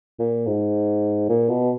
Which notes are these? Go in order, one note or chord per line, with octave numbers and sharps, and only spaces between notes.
A#2
G#2
A#2
B2